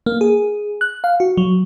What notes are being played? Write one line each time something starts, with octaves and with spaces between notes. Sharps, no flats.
A#3
G#4
F#6
F5
F#4
F#3